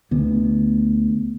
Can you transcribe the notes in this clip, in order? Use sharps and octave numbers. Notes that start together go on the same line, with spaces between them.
D2 D3 B3